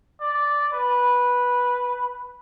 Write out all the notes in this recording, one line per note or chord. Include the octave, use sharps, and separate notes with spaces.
D5
B4